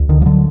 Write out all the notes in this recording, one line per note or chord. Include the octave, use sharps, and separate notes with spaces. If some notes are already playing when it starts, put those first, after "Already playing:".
Already playing: D2
D3 D#3
F3
D3 F#3